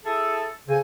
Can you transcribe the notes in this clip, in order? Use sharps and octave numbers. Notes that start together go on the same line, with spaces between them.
E4 G#4 A4
C#3 C4 A4 G#5